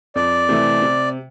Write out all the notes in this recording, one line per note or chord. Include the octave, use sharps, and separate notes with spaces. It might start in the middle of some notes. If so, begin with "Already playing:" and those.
F2 D5
C3 E3 A3
C3